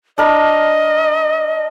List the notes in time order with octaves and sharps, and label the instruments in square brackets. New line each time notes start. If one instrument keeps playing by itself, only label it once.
[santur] D4 A#4 [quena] D#5